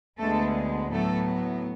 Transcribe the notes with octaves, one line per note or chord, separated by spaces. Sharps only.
D2 D3 G#3 A3 B3 A4
A2 F#3 A3 B3 A4